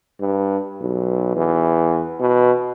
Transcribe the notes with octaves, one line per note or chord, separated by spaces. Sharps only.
G2
B1
E2
B2